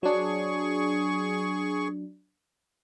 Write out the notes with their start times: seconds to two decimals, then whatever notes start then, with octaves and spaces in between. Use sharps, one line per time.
0.03 F#3 D4 G#4 C#6